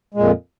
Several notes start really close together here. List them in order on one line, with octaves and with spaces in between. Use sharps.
G#3 A#2 F2